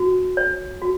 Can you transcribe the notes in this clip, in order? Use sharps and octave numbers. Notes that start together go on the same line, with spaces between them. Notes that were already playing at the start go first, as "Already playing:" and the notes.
Already playing: F#4
C#5
F#4